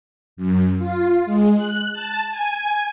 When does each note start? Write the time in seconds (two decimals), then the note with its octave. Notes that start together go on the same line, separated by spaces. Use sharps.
0.37 F#2
0.78 F4
1.26 G#3
1.56 F#6
1.93 A5
2.30 G#5